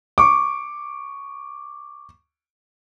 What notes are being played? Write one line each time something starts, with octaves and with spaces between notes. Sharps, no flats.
C#6 D6